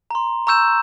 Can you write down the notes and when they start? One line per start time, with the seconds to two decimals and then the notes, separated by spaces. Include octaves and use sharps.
0.11 A#5 C6
0.47 A#5 C#6 E6 G6 E7